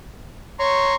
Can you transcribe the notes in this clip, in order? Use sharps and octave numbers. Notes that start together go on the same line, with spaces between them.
C#5 A#5 C6 C#6